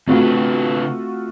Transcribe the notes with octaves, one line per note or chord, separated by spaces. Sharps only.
C#3 A3 C4 D4 F4 F#4 B4